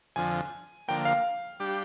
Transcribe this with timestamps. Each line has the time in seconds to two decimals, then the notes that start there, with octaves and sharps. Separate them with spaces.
0.16 F2 D3 F3 G#5
0.88 D3 F3 A#3 G5
1.05 F5
1.60 G3 D4 G4